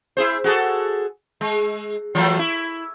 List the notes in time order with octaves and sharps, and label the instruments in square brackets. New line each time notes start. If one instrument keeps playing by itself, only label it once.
[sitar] E4 G#4 C5
F#4 G#4 A4
G#3
E3 F#3 A3
E4